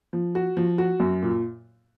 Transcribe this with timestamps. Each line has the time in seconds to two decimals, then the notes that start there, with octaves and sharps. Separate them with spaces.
0.13 F3
0.35 F#4
0.57 F3
0.78 F#4
1.00 F#2
1.22 A#2